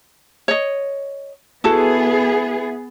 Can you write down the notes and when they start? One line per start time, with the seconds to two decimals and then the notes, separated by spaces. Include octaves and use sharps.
0.48 C#5 D#5
1.64 B3 E4 F#4 G#4 A4